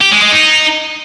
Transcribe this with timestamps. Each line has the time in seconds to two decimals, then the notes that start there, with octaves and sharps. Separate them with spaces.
0.01 G4
0.11 G#3
0.22 G#3
0.32 D#4